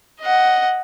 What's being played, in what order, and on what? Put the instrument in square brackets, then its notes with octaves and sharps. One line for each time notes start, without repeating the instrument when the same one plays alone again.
[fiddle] D#5 F#5